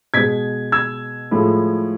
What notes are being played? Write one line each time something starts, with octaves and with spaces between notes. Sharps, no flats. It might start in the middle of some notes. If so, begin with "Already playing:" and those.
B2 G#3 G#6 B6
E6 G#6
A2 F3 G#3